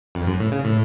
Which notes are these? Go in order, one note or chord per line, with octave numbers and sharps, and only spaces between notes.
F2
F#2
A2
C#3
A2